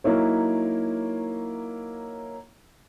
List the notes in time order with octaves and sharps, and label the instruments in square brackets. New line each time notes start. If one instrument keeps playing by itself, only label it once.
[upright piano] F#3 A#3 D#4 E4 C#5